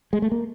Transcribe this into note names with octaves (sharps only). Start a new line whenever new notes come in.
G#3
A3
A#3